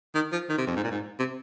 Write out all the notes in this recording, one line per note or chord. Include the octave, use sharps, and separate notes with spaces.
D#3
F3
D#3
C3
F2
G#2
A#2
G#2
C3